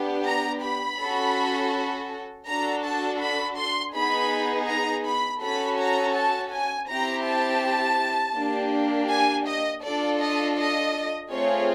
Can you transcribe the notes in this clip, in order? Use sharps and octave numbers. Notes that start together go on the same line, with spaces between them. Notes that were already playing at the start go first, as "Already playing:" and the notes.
Already playing: B3 D4 G4
A#5
B5
C#4 F#4 A4
D4 F#4 A4 A#5
A5
B5
C6
B3 D#4 G#4 B5
A#5
B5
C#4 F#4 A4 B5
A#5
A5
G#5
C4 E4 G4 A#5
A5
A#3 D4 G4
G#5
D#5
D4 F4 A4 D5
D#5
D#5
A3 C4 F4 G#4 C#5